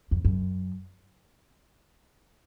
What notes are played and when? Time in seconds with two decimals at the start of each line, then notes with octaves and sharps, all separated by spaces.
0.11 F2
0.25 F#2